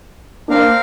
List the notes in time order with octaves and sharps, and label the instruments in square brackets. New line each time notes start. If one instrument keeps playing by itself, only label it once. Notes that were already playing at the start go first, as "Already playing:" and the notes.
[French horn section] A#3 D4 [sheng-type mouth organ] C4 A#4 F5